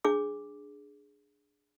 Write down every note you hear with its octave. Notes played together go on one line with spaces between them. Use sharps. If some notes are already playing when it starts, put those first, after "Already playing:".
D4 G#4 D6